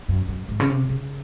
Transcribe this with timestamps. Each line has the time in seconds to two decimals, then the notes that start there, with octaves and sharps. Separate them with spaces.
0.08 F#2
0.28 F#2
0.48 G#2
0.60 C#3
0.70 C3
0.89 C#3